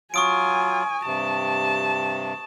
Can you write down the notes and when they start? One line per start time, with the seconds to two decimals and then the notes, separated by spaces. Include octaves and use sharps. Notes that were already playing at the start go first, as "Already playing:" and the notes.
0.14 F#3 F4 G#5 C#6 D#6 D7
1.06 G2 C3 A5